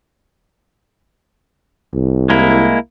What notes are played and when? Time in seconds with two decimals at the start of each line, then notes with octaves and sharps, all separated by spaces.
1.94 C2
2.30 G#3 A#3 E4